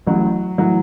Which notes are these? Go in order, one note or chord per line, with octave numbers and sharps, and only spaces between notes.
A1 A2 E3 F#3
A2 E3 F#3